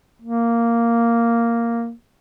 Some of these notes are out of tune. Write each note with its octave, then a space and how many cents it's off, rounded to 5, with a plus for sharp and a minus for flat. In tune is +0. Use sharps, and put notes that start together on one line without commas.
A#3 -5